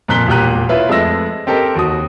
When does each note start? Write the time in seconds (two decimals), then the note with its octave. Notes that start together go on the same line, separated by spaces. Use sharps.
0.08 F2 A#2 A#5 F#6 B6 G7
0.28 E1 A#2 G4 A#5 F#6 D#7
0.69 E4 F4 B4 C#5 E5 B5
0.89 F2 G#3 A3 E6 A#6
1.47 C4 G4 A4 A#4 D#5
1.75 D#2 F#4 D#6